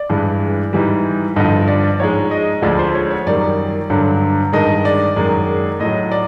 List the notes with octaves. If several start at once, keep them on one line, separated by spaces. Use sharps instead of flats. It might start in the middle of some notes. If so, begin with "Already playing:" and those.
Already playing: D5
G2 E3 G#3
G#2 E3 G3
G2 D3 F3 D#5
D5
D5
G#2 F3 G#3 C#5
D#5
D2 D3 F3 G#3 D5
C5
C#5
C#5
F#2 D#3 G3 D5
G2 D3 F#3
G2 D#3 G#3 D#5
D5
F#2 D#3 G#3
A2 F#3 D#5
D5